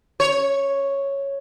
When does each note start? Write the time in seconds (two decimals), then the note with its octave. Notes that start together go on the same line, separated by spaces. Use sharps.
0.20 C#5